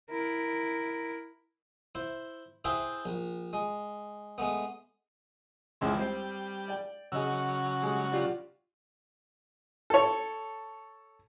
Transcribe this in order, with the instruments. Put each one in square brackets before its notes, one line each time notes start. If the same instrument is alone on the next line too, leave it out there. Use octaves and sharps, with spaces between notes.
[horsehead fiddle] E4 A#4
[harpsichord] E4 C5
E4 G#4 B4 C5 E5 G5
A#1
G#3
G#3 A3 B3
[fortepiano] C#2 G#3 [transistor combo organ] E3 C4
[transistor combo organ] G3 [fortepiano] C4 C5
[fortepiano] D5 G5
[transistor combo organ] C#3 F#3 [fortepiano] G#4 D#5 E6
[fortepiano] G3 G#3
F4 G4 D5
A4 C#5